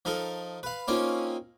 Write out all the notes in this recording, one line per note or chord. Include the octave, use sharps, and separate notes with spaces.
F3 D#4 A4 A#4
B4 F5
A#3 C4 C#4 D#4 F4